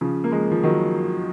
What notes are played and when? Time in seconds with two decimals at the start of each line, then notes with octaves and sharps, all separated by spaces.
0.01 C#3 F3
0.24 A#3
0.32 F3 G#3
0.51 F3
0.63 D#3 F#3